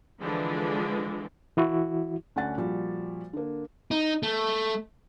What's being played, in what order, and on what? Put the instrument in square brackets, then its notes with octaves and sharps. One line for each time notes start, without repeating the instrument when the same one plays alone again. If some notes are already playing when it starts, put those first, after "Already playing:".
[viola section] D3 E3 F3 G#3 D4
[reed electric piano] E3 E4 F#4
[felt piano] D2 C#4 D4 F#5 A6
A#2 F3 G3 F#4
D3 A#3
[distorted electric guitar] D#4
A3